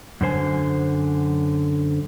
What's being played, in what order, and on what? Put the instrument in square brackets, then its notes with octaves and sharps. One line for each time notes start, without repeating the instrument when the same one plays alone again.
[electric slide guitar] F#2 D3 C5 G#5